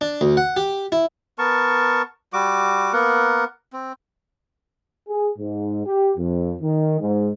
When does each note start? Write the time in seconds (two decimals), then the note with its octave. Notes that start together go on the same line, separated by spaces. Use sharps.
0.01 D4
0.21 D2
0.37 F#5
0.57 G4
0.92 E4
1.38 B3 A#4 A5 C#6
2.33 G3 F#4 D6
2.93 A#3 B3 A#4 F#5
3.73 C4
5.09 G#4
5.39 G#2
5.86 G4
6.17 F2
6.62 D#3
7.01 G#2